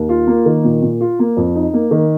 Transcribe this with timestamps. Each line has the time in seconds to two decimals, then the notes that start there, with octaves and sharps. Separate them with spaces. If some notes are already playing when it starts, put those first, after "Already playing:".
Already playing: D#2
0.09 F4
0.27 A#3
0.46 D#3
0.64 A#2
0.82 A#2
1.01 F4
1.19 A#3
1.37 F2
1.55 D#4
1.74 A#3
1.91 D#3